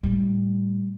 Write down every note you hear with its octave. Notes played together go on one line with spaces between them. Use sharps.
A2 G3